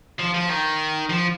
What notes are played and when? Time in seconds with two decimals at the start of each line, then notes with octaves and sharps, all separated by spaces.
0.20 F3
0.34 F3
0.49 D#3
1.10 F3